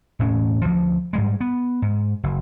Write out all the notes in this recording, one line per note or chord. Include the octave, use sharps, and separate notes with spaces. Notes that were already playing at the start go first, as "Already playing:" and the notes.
E1 A2 C#4
D2 F3
G#2 G3 G#3
B3
G#2
F#1